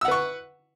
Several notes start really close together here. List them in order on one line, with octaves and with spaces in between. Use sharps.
E6 F#5 B4 C#6